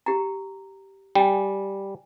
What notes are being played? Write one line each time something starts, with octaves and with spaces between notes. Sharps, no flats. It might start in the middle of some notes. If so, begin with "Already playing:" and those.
G4 A#5
G3 G5 G#5